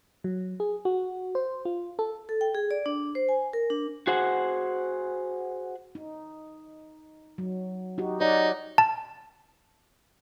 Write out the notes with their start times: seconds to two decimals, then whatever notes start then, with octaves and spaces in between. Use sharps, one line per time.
0.24 F#3
0.60 G#4
0.85 F#4
1.35 C5
1.65 F4
1.99 A4
2.29 A4
2.41 G5
2.55 G#4
2.71 D5
2.86 D4
3.15 C5
3.29 G#5
3.53 A#4
3.70 D4
4.07 F#4 G#4 C5 F#5
5.95 D#4
7.38 F#3
7.98 D#4 F#4 G4
8.20 D#4 C#5 D5 F#5
8.78 A5